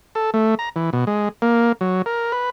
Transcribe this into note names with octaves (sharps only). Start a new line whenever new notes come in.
A4
A3
A#5
E3
B2
G#3
A#3
F#3
A#4
B4